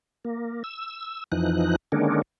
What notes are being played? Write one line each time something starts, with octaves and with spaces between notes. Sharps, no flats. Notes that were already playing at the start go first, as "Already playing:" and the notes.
A#3
E6
F2 E3 F3 D#4 F#6
D3 D#3 G#3 A#3 C#4 D4